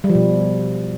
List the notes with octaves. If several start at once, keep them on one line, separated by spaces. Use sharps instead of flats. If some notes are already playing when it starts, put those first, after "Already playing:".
G3
F3
B2